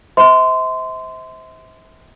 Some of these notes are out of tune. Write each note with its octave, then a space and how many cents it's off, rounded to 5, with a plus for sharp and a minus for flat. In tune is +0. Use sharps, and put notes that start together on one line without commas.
C5 -10 E5 -40 C6 -20